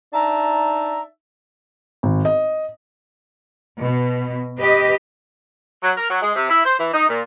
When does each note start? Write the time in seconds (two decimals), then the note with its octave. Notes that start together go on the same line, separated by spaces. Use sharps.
0.13 D4 D#4 E5 A5 A#5
2.03 G#1
2.25 D#5
3.81 B2
4.61 G4 B4 D#5
5.82 F#3
5.97 A#4
6.10 F#3
6.21 G#3
6.34 C3
6.50 E4
6.65 C5
6.78 E3
6.93 D#4
7.09 A#2